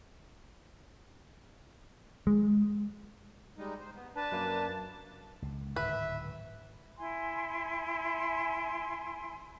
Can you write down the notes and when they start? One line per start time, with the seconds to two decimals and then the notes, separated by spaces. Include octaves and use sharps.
2.27 G#3
3.58 G3 G#3 D#4
3.80 C5
3.95 B3
4.16 D4 B4 A5
4.32 F#2 A#3
5.42 C#2
5.76 D1 G#2 D#3 B4 E5
6.98 E4 G#5 C6